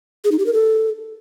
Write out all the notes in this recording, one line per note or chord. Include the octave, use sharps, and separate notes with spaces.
G#4
D#4
G4
A#4
A4